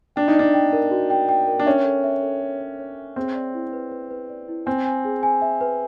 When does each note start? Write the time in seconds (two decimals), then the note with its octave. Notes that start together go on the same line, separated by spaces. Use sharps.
0.16 D4 G5
0.28 D#4
0.35 D4 D5
0.54 G5
0.73 A#4
0.91 F#4
1.10 G5
1.29 G5
1.48 A#4
1.59 D4
1.66 C#4 E5
1.85 A4
2.04 E5
2.22 A4
2.42 A4
2.61 C#5
2.80 C#5
2.98 E5
3.16 C4 G#4
3.35 D5
3.54 E4
3.73 B4
3.92 B4
4.11 B4
4.30 D5
4.48 E4
4.66 C4 G#5
4.86 G#5
5.05 G#4
5.23 G#5
5.42 E5
5.61 B4